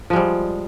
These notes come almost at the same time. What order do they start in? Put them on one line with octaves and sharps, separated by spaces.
F3 G#3 G3